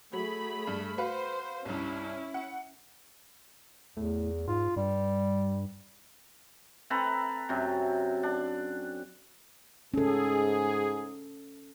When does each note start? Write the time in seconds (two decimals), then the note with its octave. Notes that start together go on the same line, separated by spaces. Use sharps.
0.13 F#3 A3 G#4 B5
0.67 G2
0.98 F#4 B4 C5 F5
1.65 C2 G2 C#4 E4
2.34 F#5
3.97 E2 A2
4.48 G#2 F4
4.77 G2 G3
6.90 C4 A4 B4 A#5
7.49 F#2 C3
8.23 D4
9.94 G#2 C#4 G#4 A4